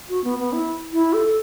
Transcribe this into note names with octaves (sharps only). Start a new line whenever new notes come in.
F#4
B3
B3
E4
E4
A4